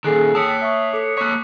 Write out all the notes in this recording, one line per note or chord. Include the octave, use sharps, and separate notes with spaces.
A#2 D#3 G#4 A4 G#5 F#6 C7
C#5 G5 A5 D#6 E6 B6 C#7
E5 C#6
A4 D6 C#7
A#3 C#5 C#6 F#6 B6